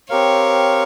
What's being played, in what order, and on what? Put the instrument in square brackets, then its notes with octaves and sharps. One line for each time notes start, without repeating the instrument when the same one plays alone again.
[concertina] C4 G4 A#4 F5 [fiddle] C#5